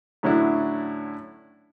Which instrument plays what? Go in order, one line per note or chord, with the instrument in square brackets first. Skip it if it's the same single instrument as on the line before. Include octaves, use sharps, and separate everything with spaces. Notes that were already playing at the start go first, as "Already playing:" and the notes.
[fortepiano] A2 D3 F#3 C#4 D4 E4